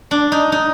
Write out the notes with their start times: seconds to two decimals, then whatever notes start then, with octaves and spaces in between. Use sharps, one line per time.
0.11 D4
0.32 D#4
0.52 D#4